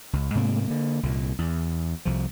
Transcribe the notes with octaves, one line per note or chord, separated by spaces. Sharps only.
C#2
G#2 C3 A3 A#3
D3 A#3
C2 A#2
E2
C2 F3